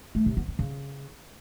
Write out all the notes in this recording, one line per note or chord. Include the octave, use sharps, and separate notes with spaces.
A3
C3
B3
C4
C#3